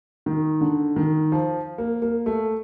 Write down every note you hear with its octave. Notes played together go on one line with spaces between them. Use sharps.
D#3
D3
D#3
F3
A#3
A#3
A3